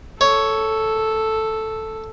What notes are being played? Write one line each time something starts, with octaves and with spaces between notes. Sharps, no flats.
A4 C#5